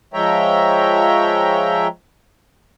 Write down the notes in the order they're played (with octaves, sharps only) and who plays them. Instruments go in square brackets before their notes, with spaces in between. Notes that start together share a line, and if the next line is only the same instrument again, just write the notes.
[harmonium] F3 G#3 C#5 E5 G5 A#5